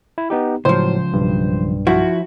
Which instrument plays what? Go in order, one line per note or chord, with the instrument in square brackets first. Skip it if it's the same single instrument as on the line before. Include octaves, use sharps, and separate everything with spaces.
[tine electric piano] E4
B3 D#4 G4
[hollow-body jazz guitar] C#2 F3 [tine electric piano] A2 F#3 [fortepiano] C5
[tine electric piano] B1 G2
[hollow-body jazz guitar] F3 E4 [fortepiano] F#4